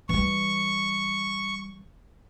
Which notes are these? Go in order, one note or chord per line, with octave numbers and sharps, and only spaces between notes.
E3 G3 C#6